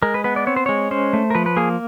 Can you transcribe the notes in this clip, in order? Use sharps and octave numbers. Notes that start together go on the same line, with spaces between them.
G#3 A#4
B4
B3 B4
D5
C4 C#5
C5
G#3 C#5
C#4 C5
A3
A#4
F3 B4
B4
A#3 G#4